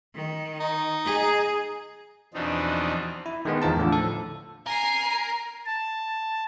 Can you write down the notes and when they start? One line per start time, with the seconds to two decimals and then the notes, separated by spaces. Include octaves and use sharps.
0.15 D#3
0.61 D#4
1.05 G#4
2.34 E2 B2 F3 C4 D4 D#4
3.26 E4
3.45 D#3 G#3 B3
3.62 E2 D#3 F3 A#4 A5
3.77 A2 D3 F3
3.92 A4
4.67 A#4 G#5 C7
5.66 A5